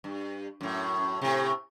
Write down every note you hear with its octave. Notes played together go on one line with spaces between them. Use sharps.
G2
F#2 A2
A2 C3